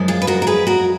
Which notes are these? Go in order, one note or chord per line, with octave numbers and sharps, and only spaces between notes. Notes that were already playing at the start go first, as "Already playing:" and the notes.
Already playing: F#2 F3 G#3
F4 G#4
B4
F#4 A#4
A#4
G#4 B4
F#4 A#4